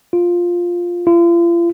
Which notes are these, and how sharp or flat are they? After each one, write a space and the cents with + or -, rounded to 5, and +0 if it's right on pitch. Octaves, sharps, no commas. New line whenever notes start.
F4 +5
F4 -40